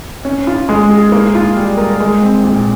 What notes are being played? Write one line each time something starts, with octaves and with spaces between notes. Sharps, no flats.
C#4
F4
G#3
G#4
A#3
F4
G3
A#4
G#3
C4
A#2